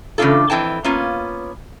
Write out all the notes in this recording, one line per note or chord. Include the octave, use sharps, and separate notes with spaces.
C#3 E3 A3 D4 F4 A4
F2 E3 G5 A5
A#3 B3 C#4 F4